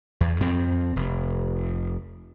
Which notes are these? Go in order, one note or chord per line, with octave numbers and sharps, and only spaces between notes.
E2
F2 C4
F1